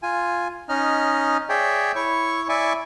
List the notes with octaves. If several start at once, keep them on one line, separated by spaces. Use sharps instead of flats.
F4 G#5
C#4 D#4 D#5 F6
G#4 C#5 D5 E5 G5
E4 C#5 C#6
E4 D5 E5 G#5 C#6 D6